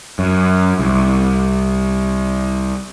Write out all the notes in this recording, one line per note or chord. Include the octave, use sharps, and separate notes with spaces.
F#2
C2